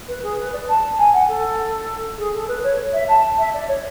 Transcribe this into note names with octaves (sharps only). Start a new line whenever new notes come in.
B4
G#4
B4
D5
A5
G#5
F#5
A4
G#4
A4
B4
C#5
E5
A5
E5
D5
C#5